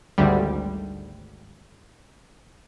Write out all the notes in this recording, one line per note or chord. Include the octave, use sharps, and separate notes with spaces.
G#1 D2 D3 G3